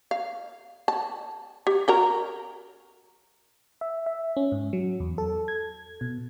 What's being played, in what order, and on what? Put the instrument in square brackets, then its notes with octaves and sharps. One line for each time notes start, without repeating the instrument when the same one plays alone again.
[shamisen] F5
A5
G4
F#4 A#4 A#5
[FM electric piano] E5
E5
C#4
G#2
F#3
E2
A4
G#6
B2